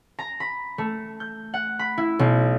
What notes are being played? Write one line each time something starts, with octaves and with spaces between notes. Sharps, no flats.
A#5
B5
A3
G6
F#5
B5
E4
B1